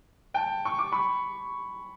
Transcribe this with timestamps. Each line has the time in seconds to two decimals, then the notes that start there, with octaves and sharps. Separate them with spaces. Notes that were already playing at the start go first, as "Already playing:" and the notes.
0.34 G5 A5
0.65 C#6
0.79 D6
0.92 B5 C#6